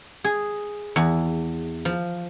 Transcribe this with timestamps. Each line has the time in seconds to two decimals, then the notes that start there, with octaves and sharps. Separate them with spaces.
0.24 G#4
0.96 E2
1.85 F3